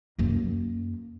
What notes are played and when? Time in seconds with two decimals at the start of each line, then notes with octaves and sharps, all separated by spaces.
0.18 F#2 A#3